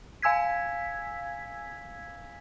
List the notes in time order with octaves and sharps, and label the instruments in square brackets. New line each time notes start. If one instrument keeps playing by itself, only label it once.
[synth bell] F5 G#5 E6 G#6 B6